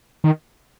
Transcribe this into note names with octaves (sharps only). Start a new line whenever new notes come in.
D#3